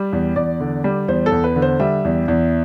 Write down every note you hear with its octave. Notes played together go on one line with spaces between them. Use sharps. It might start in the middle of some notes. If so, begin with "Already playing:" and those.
Already playing: G3
E2
E2 D5
D3
G3
E2 C5
A4
E2
B4
D3
C5
G3 E5
E2
E2